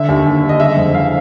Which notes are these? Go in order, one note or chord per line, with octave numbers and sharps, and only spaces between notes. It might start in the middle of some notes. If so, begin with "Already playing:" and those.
Already playing: D3 E5
D#2
D#2
D3
D#5
C#3 E5
F2
E3 F5